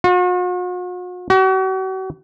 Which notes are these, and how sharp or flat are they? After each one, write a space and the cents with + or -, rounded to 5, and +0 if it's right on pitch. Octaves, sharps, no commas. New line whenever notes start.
F#4 -45
F#4 +40